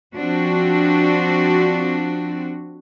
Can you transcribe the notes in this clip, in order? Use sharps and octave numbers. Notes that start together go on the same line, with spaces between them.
F3 C4 D4 F#4